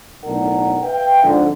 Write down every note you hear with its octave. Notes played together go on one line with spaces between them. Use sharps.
B1 A2 D4 A#4 F#5
B4 E5 F5 G5
F2 G#2 D3